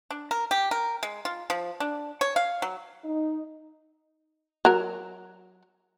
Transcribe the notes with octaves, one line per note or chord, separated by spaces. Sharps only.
D4
A#4
G4
A#4
G#3
F4
F3
D4
C#5
F5
F#3
D#4
F#3 A#4